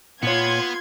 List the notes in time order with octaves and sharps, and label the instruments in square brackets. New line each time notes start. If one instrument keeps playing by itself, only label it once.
[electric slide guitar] A#2 C#5 [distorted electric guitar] B3 [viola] F4 [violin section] C6 G#6